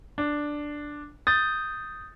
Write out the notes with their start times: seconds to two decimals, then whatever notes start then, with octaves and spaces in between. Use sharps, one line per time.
0.18 D4
1.27 D#6 G6 A6